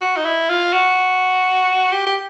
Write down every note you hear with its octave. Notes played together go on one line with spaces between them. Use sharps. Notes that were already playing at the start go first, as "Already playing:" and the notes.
F#4
D#4
E4
F4
F#4
G4
G4